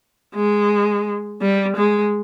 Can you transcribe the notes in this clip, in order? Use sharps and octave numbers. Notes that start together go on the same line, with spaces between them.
G#3
G3
G#3